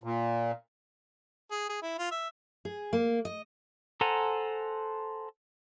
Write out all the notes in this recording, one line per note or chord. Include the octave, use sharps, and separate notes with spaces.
A#2
G#4
G#4
E4
F4
E5
G#4
A#3
D#5
A4 C5 F#5 G#5 A#5